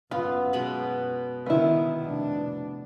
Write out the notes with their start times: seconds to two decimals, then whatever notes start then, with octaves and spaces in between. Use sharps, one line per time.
0.11 F#2 B3 F4
0.53 B2 G#3 B5
1.46 D#3 B3 E4
2.01 F1 D4